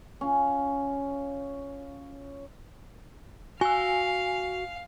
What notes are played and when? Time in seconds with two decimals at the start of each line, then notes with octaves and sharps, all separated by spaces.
0.21 C#4 F4
3.61 F#4 F5 G#5 E6